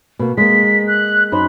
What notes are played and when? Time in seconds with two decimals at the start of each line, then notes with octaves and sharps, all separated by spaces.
0.19 B2 A#3
0.37 G#3 A#3 B6
0.87 F#6
1.32 F#2 D#4 C5 B5